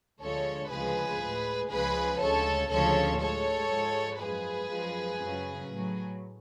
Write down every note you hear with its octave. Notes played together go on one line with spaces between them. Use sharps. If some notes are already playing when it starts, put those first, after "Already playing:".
D2 D3 F3 G#3 A4 C#5
D2 C#3 F3 G#3 G#4 B4
A2 G#3
C#2 C#3 F3 G#3 G#4 B4
D2 C#3 G#3 A4 C#5
D2 C#3 F3 G#3 A4 C#5
A2 G#3 A4 C#5
G#2 F3 G#3
F#2 F3 G#3 G#4 B4
F#2 F3 G#3
F#2 C#3 F#3
A2 F#3